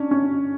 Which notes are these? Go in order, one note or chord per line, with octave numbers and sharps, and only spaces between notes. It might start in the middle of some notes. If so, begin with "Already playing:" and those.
Already playing: C#4 D4
C#4